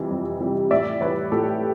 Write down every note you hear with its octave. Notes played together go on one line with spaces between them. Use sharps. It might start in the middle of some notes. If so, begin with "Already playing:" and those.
Already playing: F2 C3 E3 G3
F2
C3 E3 G3
A2 D5 E5
E3 G3 B4 C#5
A2 G4 A4